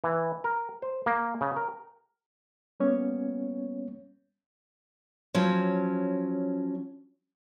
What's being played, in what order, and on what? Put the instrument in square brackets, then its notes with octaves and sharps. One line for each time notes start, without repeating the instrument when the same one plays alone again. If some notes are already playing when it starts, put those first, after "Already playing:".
[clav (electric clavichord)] E3
A#4
C5
A#3
C#3
A#4
[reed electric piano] G3 A#3 B3 C#4 C#5
[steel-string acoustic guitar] F3 F#3 C#4